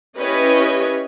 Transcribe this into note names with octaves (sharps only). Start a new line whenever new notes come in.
C#4 E4 G4 B4 C#5 D#5